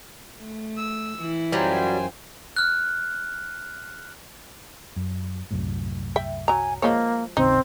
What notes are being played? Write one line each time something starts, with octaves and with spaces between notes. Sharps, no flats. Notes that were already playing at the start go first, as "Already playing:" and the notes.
A3
E6
E3 E4
F#2 F#3 G3 F4 C5 G5 G#5
F6 F#6
F#2
C2 F#2 A2
E5 G5
F#3 G#5 A#5
F3 G#3 A#3 C#5
D#1 A1 C#3 C4 D#4